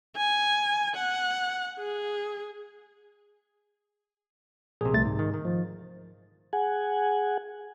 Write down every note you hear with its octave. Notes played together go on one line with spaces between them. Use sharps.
G#5
F#5
G#4
A#1 C3 G#4
C2 A3 A6
G#2
D#3
D#3
F3
G#4 F#5 G#5